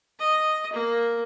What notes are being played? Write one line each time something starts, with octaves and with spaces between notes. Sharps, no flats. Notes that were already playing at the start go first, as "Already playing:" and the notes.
D#5
A#3